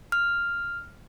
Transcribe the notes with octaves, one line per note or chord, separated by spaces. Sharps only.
F6